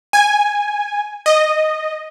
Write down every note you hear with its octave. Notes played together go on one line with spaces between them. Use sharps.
G#5
D#5